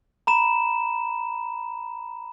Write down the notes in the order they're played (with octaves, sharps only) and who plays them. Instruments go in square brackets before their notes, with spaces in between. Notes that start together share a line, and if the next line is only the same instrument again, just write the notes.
[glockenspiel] A#5 B5 E7